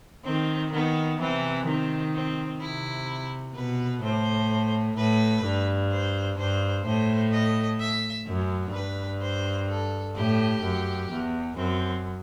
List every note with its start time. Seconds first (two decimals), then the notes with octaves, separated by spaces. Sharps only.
0.25 D#3 C4
0.72 D#3 B3
1.20 C3 E3 C4
1.67 D#3 C4
2.15 C4
2.60 C3 E4
3.55 B2 B4
4.02 A2 C5
4.97 A2 B4
5.44 G2
5.91 C5
6.39 G2 C5
6.85 A2 C5
7.32 D#5
7.80 E5
8.27 F#2
8.74 G2 B4
9.21 C5
9.69 A4
10.16 A2 G4
10.63 F#2
11.10 E2
11.57 F#2 C4